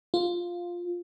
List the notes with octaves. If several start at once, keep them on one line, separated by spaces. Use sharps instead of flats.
F4